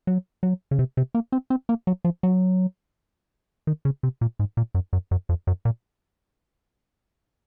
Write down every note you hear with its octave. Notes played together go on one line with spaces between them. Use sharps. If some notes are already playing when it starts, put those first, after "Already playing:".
F#3
F#3
C#3
C3
C3
A#3
C4
C4
A#3
F#3
F3
F#3
D#3
C#3
C3
A#2
G#2
A#2
F#2
F#2
F#2
F2
F#2
A#2